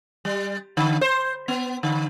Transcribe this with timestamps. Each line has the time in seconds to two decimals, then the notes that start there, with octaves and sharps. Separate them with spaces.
0.25 G3
0.77 D3
1.01 C5
1.48 B3
1.83 D3